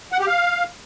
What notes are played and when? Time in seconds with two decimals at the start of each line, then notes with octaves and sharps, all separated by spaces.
0.12 F#5
0.20 G4
0.27 F5